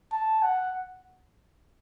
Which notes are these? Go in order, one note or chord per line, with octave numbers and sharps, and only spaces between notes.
A5
F#5